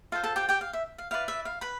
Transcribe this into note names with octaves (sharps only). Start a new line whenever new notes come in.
F4 A4 C5 F5
A4 A5
G4 G5
G4 G5
F5
E5
F5
E4 B4 D5 F5
E5
F5
B4 B5